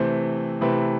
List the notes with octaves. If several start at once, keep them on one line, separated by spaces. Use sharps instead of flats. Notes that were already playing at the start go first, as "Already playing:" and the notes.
Already playing: C3 E3 A3 C4 C5
C3 E3 A3 C4 B4